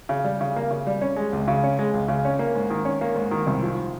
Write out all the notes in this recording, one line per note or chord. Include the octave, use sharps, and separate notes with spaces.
C#3
G3
C#3
A#3
C#3
G3
C#4
G#3
C#2
C#3
C#4
G#3
C#2
C#3
C#4
A#3
G#2
D#3
C#4
A#3
G#2
D#3
C2
F3